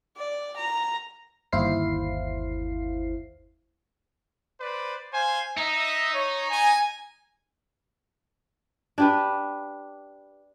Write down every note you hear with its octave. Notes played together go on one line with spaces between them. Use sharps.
D5
A#5
G1 D#2 E4 C5 F5 C7
B4 C5 D5
C5 F5 G#5
D#4 D#5 E5
C#5
G#5
D4 G4 B4